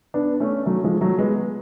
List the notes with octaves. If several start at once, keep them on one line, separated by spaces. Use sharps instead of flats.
B3 D4
A3 C#4
F#3 A3
F3 G#3
F#3 A3
G#3 B3